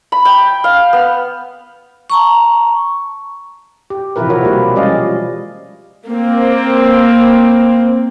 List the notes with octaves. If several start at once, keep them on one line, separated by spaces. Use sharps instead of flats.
B5
G5
F5
B3
A5 A#5 C#6
G4
C3 E3 F3 E4 A#4 B4
B2 E3 F#4 A#4 C#5
G3 A#3 E4 G4
G3 G#3 C#4 D5 D#5 F5
F3
A#3 C4